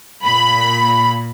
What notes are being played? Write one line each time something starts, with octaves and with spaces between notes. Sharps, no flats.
A#2 B5